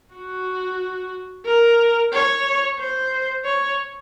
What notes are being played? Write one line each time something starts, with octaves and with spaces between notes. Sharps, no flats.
F#4
A#4
C#5
C5
C#5